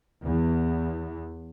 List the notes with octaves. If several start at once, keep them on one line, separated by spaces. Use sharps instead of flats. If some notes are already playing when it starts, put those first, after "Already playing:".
E2